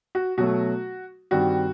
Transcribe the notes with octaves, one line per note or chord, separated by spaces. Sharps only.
F#4
B2 F#3 A3 F#4
G2 D#3 G3 C4 F#4